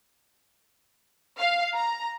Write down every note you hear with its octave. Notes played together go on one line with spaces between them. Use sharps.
F5
A#5